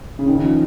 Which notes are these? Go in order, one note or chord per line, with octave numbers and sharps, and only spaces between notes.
C#3
D#3
F3